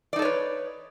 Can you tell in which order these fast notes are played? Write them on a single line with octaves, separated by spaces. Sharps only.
D5 D#4 A4 C#5 B4